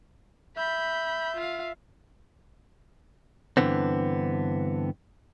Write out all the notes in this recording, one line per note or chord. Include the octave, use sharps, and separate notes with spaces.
E5 B5 G6
F4 F5
G2 A#2 D3 E3 B3 C4